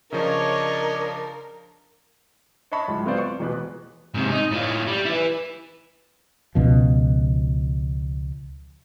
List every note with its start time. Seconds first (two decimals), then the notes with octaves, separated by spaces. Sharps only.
0.12 C#3 F3 D4 A#4 C#5 D#5
2.71 C#5 D#5 E5 A5 B5 C#6
2.88 D1 C#2 G#2
3.06 B3 C4 F4 F#4 C5 D5
3.18 C#6
3.39 E1 E2 B2 B4
4.14 G#2 C3
4.31 D#4
4.51 A2 F4
4.87 G3
5.05 E4 B4
6.55 C#2 B2 F3